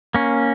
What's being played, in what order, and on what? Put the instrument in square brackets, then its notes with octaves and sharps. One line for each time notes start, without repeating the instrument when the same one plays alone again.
[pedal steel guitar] A#3 C#4